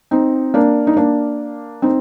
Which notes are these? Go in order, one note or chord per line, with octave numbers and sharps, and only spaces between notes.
C4 D#4
A#3 D4
D#4
A#3 D4
C4 D#4